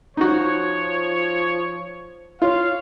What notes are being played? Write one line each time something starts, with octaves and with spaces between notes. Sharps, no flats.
F3 D#4 F#4 C#5
F4 C#5 F5